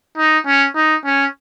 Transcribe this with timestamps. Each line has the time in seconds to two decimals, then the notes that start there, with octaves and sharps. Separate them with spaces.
0.18 D#4
0.46 C#4
0.75 D#4
1.05 C#4